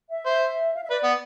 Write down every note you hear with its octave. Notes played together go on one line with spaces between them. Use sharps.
E5
C5
F5
E5
B4 D5
B3